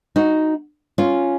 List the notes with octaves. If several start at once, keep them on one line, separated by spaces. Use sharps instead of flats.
D#4 F#4
C#4 F4